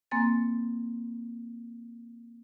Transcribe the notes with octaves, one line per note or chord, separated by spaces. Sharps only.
A#3 C4 G#5 C6 A6